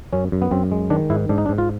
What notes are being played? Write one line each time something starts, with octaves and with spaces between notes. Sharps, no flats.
F#2 C#4
F#2
B3
F#2 C4
G#3
D#3 D4
G#2 E4
G#2 D4
D#4
D4
G#2
F4